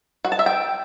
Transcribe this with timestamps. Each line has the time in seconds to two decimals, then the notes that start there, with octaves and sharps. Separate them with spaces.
0.25 F#4
0.32 A5
0.39 E5
0.46 G5